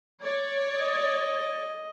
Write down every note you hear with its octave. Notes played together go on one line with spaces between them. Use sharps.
C#5 D5
D#5